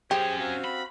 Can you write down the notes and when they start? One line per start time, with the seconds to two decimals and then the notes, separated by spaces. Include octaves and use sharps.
0.11 F#2 C#4 G4 G#4 C5
0.39 C4 F#4 F5
0.64 B5